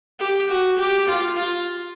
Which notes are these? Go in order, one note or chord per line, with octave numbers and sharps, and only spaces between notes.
G4
F#4
G4
F4
F4